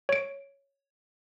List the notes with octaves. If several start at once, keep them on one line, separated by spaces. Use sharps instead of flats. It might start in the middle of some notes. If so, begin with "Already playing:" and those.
C#5 D7